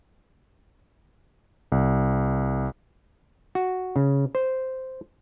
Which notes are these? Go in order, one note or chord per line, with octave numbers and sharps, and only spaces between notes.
C2
F#4
C#3
C5